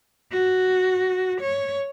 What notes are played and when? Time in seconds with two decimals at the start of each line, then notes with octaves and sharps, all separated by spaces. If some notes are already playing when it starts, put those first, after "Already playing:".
0.31 F#4
1.41 C#5